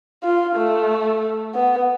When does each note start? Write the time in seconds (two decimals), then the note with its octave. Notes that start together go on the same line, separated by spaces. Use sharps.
0.23 F4
0.56 A3
1.54 B3